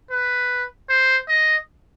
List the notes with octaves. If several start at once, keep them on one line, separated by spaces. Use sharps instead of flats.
B4
C5
D#5